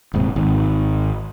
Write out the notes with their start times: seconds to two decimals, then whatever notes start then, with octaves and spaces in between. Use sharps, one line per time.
0.14 D#1 G#2 C3
0.36 G#1